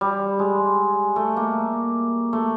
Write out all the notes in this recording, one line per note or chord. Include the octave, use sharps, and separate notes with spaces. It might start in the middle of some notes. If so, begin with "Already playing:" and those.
G3
G#3
A3
A#3
A3